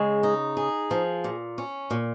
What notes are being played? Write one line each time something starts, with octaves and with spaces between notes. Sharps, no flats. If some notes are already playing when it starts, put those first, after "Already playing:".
Already playing: C#3 G#3
D#4
G#4
F3
A#2
C#4
A#2